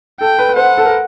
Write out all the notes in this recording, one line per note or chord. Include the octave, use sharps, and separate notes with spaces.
A4 G5
B4
B4
C5 F#5
A4
A#4